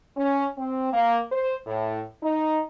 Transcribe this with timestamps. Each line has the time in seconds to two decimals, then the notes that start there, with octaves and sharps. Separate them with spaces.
0.17 C#4
0.58 C4
0.93 A#3
1.32 C5
1.67 A2
2.23 D#4